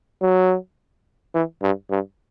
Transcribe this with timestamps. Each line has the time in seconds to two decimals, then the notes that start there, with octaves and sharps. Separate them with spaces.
0.22 F#3
1.34 E3
1.62 G2
1.90 G2